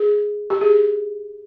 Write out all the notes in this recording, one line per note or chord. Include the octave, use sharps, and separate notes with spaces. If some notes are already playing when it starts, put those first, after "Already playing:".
Already playing: G#4
G4
G#4